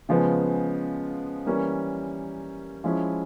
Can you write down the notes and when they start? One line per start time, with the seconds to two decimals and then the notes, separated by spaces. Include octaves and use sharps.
0.09 C#3 F3 G#3 B3
1.46 E3 G3 A#3 C#4
2.84 F3 G#3 C#4 E4